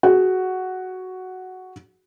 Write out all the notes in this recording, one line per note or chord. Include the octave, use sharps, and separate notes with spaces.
F#4 G#4